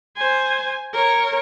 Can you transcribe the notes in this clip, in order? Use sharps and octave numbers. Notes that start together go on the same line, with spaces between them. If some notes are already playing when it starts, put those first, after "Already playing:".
C5 G#5
A#4 C#5